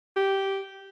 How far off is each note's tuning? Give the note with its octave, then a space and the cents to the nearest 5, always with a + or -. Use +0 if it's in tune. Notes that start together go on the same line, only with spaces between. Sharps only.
G4 -10